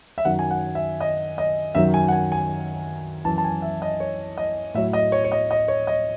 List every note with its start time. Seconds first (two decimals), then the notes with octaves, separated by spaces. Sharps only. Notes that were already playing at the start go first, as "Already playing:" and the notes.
0.18 E5
0.25 F#2 D#3 F#3 F#5
0.39 G#5
0.51 F#5
0.75 E5
1.01 D#5
1.38 D#5
1.75 F#2 D#3 F#3 E5
1.94 G#5
2.08 F#5
2.12 G#5
2.32 G#5
3.25 F#2 E3 A5
3.38 A5
3.44 G#5
3.62 E5
3.82 D#5
4.00 C#5
4.37 D#5
4.74 A2 F#3 E5
4.93 D#5
5.12 C#5
5.24 C#5
5.32 D#5
5.51 D#5
5.68 C#5
5.87 D#5